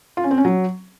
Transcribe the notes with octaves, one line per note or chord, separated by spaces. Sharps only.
F4
C#4
C4
C#4
F#3